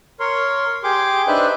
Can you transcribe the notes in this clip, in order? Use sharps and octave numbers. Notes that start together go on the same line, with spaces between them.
A#4 C#5 C6
G4 G#4 C6 D6
D4 D#4 B4 C5 E5 F#6